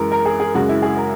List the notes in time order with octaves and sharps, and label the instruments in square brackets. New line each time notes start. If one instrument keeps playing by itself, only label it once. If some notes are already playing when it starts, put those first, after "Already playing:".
Already playing: [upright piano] F#2 E3 G#3 A#4
A#4
G#4
G#4
F#2 C#3 G#3 F#4
E4
G#4
A#4